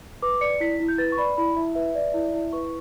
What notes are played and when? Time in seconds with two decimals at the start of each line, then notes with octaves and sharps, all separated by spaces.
0.22 B4 D6
0.41 D5 C#7
0.60 E4 B6
0.80 E4
0.88 G6
0.98 B4 A6
1.12 C#6
1.18 D5 B5
1.37 E4 B5
1.56 E4 E5
1.75 B4 E5
1.95 D5
2.14 E4
2.34 E4
2.53 B4 C#6